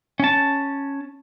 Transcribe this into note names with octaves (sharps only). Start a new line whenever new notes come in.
C#4 A5